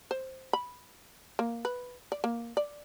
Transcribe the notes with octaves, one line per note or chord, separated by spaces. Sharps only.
C5
B5
A#3
B4
D5
A#3
D5